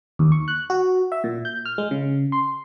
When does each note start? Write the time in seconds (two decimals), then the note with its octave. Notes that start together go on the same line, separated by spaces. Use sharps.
0.19 D#2
0.32 C#6
0.48 F#6
0.70 F#4
1.12 E5
1.24 A#2
1.45 G6
1.65 F6
1.78 G#3
1.91 C#3
2.32 C6